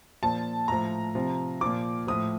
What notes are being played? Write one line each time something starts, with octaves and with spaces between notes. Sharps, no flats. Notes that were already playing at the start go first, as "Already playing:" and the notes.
A#2 F3 A5
A2 F3 A#5
C3 F3
A#2 F3 D6
A2 F3 D#6